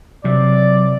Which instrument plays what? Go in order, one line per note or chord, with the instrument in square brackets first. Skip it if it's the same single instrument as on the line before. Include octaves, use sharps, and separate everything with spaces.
[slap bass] C3 [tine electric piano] F#3 [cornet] D5